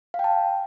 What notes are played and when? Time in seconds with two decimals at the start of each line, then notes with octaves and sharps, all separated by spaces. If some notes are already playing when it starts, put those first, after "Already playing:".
0.14 F5
0.19 G5
0.24 A5